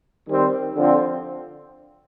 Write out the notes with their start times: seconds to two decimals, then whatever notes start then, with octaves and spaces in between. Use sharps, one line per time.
0.26 D#3 G3 C4
0.75 D3 F3 C4